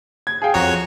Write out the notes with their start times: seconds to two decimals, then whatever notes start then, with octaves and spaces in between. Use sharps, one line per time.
0.27 G#6
0.42 G#4 F5 G5
0.54 F2 F#4 C#5 A#5